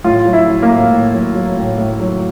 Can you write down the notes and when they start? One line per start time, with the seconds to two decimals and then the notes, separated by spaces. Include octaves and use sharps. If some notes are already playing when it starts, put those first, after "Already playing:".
0.04 A2 F4
0.26 F#3
0.33 E4
0.48 F#3
0.62 A#3
0.70 A2
0.91 A2
1.14 F#3
1.35 F#3
1.57 A2
1.78 A2
2.00 F#3